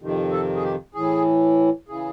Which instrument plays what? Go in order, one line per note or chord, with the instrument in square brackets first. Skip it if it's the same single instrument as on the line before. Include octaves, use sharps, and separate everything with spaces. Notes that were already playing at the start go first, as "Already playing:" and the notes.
[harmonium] F2 C3 D#3
A4
G#4
G4
A2 E3 G#4
C#3 E3 G#4